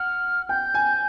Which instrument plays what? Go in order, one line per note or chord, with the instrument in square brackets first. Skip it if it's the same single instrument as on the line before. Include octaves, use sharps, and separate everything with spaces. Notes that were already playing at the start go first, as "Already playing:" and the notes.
Already playing: [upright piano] F#5 [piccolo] F6
[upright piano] G5 [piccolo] G6
[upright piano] G#5